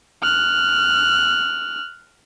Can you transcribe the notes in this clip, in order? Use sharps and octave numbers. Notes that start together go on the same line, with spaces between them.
F6 F#6